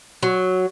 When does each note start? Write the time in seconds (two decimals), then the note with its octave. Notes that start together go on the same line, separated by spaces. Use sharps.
0.23 F#3